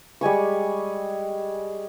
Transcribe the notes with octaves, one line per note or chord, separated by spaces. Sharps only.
G3 G#3 G#5 C#6